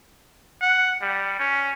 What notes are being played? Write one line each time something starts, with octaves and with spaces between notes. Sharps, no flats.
F#5
G3
C#4